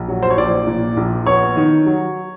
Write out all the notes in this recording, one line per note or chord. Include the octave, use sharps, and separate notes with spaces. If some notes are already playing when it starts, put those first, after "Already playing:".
Already playing: A#1
F#3
C5
C#5
A#1 D5
A#2
A#1
B3 C#5
D#3
F#3